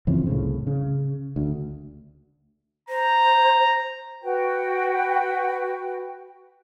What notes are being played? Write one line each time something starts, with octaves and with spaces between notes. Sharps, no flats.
F2 C#3 E3 C4
C2 A2 C#3
C#3
D2
C5 A#5
F#4 B4 G5